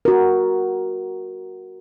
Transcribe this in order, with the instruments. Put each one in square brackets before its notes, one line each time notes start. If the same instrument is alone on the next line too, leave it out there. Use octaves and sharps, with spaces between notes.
[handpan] F#4 A#4